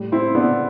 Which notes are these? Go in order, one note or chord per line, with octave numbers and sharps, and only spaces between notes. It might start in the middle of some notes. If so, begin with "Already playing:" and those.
Already playing: A2 G3
C4 E4
B3 D4